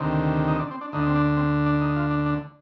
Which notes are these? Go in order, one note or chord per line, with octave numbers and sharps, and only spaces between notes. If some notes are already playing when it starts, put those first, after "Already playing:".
Already playing: D2 C3 D#3
D#4
D4
C4
D4
D2 D3 D#4
C4
D4
C4
D4
D#4
F4
D4
D4